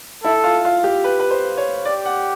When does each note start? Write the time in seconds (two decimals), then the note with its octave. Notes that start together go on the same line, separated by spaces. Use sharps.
0.24 E4 A4
0.44 F4
0.65 F4
0.84 G4
1.04 B4
1.20 B4
1.31 C5
1.58 C#5
1.85 G4 D5
2.05 F#5